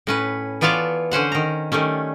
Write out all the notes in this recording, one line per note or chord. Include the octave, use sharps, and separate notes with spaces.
A2 C#4 B4
E3 B3 F4 C#5 D5 A5
D3 C#4 C5 F#5
D#3 A#5
D#3 G3 A3 C#4